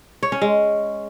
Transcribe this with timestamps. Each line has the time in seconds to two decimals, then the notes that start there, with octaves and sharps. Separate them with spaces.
0.23 C#5
0.32 C#4
0.42 G#3